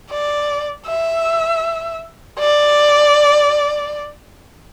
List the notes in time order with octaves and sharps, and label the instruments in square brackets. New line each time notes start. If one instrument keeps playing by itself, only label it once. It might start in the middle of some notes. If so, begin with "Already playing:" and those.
[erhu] D5
E5
D5